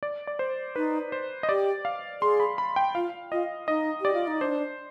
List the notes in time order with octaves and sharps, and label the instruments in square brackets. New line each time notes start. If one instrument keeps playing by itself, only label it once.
[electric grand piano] D5
D5
C5
[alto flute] D#4 [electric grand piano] B4
[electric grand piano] C5
D#5
[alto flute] G4 [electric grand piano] D5
[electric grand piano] F5
[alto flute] G#4 [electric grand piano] C6
[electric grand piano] B5
B5
G5
[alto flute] F4 [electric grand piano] F5
[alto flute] F4 [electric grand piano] D#5
[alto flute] D#4 [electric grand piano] D#5
[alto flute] G4 [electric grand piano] D5
[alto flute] F4
D#4
[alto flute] D4 [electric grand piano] C5